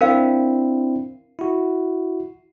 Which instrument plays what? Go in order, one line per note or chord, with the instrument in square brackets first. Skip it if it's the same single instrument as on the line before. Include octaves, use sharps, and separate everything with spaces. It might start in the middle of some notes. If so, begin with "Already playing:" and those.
[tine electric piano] C4 D4 E4 [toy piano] A#4 F5
[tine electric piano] E4 F#4